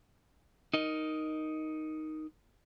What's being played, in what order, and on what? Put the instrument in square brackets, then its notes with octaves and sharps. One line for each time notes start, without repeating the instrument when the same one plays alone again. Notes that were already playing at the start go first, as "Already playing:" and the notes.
[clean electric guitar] D#4 A#4 D#5